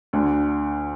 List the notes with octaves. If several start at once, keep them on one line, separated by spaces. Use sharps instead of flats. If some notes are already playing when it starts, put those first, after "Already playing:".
D2 D3